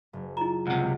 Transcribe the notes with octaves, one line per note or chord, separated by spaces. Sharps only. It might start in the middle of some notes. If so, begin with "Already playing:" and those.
F#1
E4 F4 A#5
C#2 C3 F#5